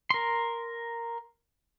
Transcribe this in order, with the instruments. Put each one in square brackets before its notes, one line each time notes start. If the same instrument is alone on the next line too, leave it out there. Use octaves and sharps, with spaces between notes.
[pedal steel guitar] A#4 C6